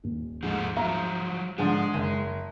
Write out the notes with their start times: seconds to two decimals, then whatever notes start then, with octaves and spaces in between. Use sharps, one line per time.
0.04 D#1
0.43 G#2 F3 A3 D#4
0.76 F3 F#3 E5 F5 A#5
1.58 G#2 D3 F3 G#3
1.94 F#1 D#7